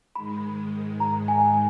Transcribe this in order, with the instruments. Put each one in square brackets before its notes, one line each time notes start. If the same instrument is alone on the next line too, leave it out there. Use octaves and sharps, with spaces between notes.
[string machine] G#2 D#3 G#3 [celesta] B5
[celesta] A#5
G#5